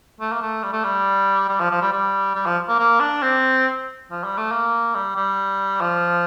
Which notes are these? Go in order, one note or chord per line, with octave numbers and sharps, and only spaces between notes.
A3
A#3
A3
G3
A3
G3
G3
F3
F3
G3
G3
G3
F3
A#3
A#3
D4
C4
F3
G3
A3
A#3
G3
G3
F3